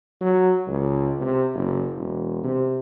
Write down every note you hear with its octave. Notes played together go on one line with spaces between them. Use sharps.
F#3
C#2
C3
F#1
E1
C3